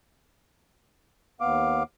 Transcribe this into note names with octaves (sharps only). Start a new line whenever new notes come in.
D#2 B3 F5 D6